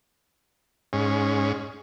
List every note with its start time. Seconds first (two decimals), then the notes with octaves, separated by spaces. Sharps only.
0.93 G#2 C#4